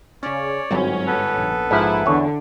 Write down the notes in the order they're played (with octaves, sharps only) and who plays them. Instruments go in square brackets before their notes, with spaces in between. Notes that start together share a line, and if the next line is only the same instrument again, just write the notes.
[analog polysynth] C#3 C#4 [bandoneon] C#5 D5
[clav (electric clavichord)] G1 [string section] G#2 C#4 [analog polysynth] F#3 C4
[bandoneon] B3 A4 B4
[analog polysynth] A#1
[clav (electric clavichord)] G#2 F3 [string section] E4
[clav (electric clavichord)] E2 C#5 [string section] D3